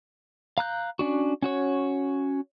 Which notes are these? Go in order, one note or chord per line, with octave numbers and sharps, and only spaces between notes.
F5 A#5 F#6 G6
C#4 D4 F#4
C#4 F#4 C#5